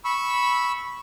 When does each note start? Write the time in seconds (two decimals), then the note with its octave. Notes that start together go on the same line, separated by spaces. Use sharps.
0.05 B5 C#6 E6